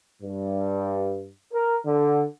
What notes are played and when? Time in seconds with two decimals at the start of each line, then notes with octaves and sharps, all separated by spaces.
0.22 G2
1.53 A#4
1.86 D3